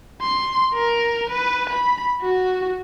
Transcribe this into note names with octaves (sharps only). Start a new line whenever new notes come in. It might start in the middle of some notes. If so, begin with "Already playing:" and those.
C6
A#4
B4
B5
F#4